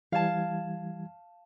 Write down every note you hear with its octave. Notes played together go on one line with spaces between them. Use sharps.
E3 G3 F5 A5 G#6